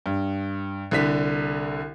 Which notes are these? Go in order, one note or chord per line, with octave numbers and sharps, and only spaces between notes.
G2
C2 D3 B6